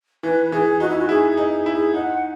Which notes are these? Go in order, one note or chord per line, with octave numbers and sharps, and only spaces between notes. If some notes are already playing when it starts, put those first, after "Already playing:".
E3 B4
E3 G#4
D#4 F#4
E4
F#4
E4 G#4
G#4
D#4
G#4
E4
G#4
D#4 F#5